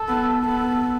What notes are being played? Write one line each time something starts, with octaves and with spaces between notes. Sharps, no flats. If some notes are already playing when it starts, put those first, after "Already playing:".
Already playing: A4
B3
B3 A4